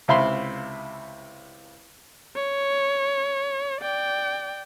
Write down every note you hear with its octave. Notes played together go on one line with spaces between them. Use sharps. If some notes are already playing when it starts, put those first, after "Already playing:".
C#2 C3 E4 F5 B5 C6
C#5
D5 G5